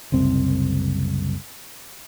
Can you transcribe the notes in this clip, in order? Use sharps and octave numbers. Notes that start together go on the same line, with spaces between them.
F#1 C2 C4